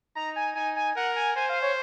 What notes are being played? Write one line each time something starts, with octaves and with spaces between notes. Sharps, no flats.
D#4 A#5
G#5
D#4 G#5
G#5
A#4 F#5
G#5
C5 G#5
F5
C#5